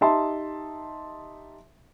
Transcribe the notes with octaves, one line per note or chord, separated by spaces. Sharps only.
D#4 G4 E5 A5 C6